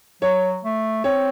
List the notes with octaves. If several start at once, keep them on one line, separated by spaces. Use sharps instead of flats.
F#3 C#5
A3
C4 C#5